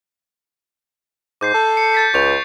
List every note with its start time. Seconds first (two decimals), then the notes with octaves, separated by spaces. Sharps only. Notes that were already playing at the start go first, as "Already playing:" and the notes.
1.41 G#2 D6 G6 C7
1.54 A4
1.77 C#7
1.94 G6 A6 B6
2.14 C#2 C#6 G6 F7